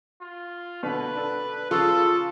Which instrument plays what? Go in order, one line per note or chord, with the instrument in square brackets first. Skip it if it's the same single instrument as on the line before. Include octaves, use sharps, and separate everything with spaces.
[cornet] F4
[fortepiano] B2 D3 [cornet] B4
[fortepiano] D4 A4
[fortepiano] C#3 [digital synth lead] F4 [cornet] A4